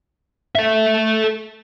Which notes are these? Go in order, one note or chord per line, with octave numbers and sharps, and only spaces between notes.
A4 E5